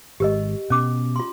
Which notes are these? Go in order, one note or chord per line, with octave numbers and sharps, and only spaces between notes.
G#1 G#3 G4 A#4 D#5
B2 C#4 D6
F4 C6